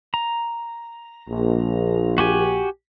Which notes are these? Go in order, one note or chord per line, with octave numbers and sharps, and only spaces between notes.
A#5
A#1
F#4 G4 G#5